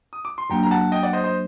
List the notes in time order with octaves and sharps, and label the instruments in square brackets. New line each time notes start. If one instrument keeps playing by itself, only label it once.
[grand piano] D#6
D6
C6
[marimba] F#2 F#3 A#3 D4 [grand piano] G5 A#5
[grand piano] A#5
F#5 A5
D#5 G5
D5 F#5
C5 D#5
C5 D#5